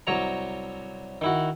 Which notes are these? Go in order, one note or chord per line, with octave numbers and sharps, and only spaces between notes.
C2 F#3 C#5 A#5
D#3 E4 F#4